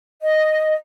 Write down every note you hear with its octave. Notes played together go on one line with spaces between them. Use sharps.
D#5